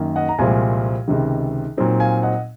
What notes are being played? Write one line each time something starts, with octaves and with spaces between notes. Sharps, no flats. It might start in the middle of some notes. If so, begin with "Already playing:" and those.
Already playing: F#2 D#3 A#3
D#5 F#5
A#5
C2 A#2 F3 G#3 C4 F5 G#5
C#2 C3 D#3
A#2 F#3 C4 D#4
F5 G#5
D#5 F#5